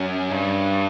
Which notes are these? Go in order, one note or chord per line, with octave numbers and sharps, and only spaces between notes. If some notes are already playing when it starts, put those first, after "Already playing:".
Already playing: F#2
G2